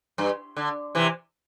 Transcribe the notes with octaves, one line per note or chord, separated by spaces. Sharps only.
G2
D3
C3 E3